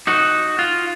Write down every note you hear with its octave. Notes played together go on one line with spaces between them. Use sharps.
D#4 F#4
F4